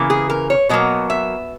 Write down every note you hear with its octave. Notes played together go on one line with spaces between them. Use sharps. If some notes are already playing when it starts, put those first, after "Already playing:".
Already playing: C#3 E3 A#3
G#4
A#4
C#5
B2 F#3 A#3 D#5
E5